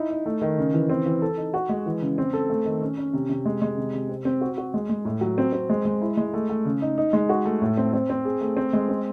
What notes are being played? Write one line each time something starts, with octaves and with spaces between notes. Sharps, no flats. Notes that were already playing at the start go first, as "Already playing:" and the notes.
Already playing: D#4 E4
D#4
A3
D#3
C#3
E3
C4
E3
A4
D#4
F#4
G#3
E3
C#3
C4
A4
A3
D#3
C#4
C#4
C3
C3
G#3
G#3
C3
C3
C4
C4
F#4
F#4
G#3
G#3
A2
F#3
C4
C4
G#3
G#3
E4
G#3
A3
A3
C#3
D#4
D#4
G#3
F#4
A3
A2
C4
C4
C4
G#4
A3
C4
G#3
C4